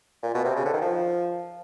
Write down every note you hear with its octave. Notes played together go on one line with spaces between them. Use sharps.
A#2
B2
C3
C#3
D3
D#3
F3